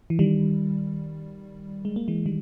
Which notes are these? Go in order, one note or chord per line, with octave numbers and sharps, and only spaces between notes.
E3
D#3 G3
G#3
A#3
E3 G#3
D#3 G3